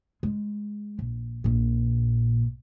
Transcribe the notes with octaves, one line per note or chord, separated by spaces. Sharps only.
G#3
A#1
A#1 A#2